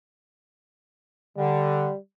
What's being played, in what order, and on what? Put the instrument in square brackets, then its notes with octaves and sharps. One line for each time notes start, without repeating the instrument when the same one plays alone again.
[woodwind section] D3 [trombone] G3